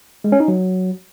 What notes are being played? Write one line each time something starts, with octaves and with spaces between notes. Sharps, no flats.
G#3
C#4
D#4
F#3